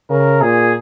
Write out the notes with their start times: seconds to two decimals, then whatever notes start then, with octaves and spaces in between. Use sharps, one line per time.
0.10 C#3 A#4
0.41 A#2 G#4